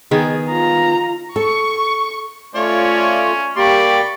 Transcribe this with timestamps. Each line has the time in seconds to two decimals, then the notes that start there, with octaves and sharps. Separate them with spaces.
0.11 D#3 B3 G#4
0.50 F4 A#5
1.36 A4 C#6
2.55 A3 C#4 F4 C#5 D5
3.57 A#3 G4 D5 B5 C#6